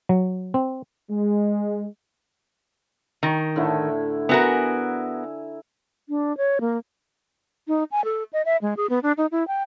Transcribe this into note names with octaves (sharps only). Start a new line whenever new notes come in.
F#3
C4
G#3
D#3 A#5 C#6
A2 D3 E4
B3 F#4 A#4 E5 G#5 A#5
D4
C#5
A#3
D#4
G#5
A4
D#5
E5
G#3
G#4
B3
D4
D#4
E4
G5